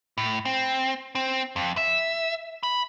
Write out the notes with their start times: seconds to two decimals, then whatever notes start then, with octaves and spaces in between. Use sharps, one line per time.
0.18 A2
0.45 C4
1.15 C4
1.56 F2
1.77 E5
2.63 B5